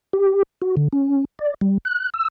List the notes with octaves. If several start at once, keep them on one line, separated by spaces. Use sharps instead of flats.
G4
F#4
D3
C#4
D5
G3
F#6
E6